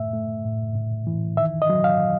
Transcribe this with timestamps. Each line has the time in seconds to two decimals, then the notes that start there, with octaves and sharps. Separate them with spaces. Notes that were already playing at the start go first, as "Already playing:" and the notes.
Already playing: A2 A3 E5
0.13 A3
0.45 A2
0.75 A2
1.07 E3
1.37 D#3 E5
1.62 D#5
1.70 F#3
1.84 F5